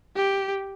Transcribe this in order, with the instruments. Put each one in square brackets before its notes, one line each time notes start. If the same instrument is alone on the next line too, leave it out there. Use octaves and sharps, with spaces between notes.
[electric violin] G4